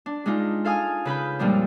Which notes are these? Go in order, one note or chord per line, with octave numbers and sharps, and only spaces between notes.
D4
G#3 D4 D#4 F4
A4 F5 G#5 D#6 F6
C#3 B4 B5 G6
F2 A#2 F3 G3 G#3 D4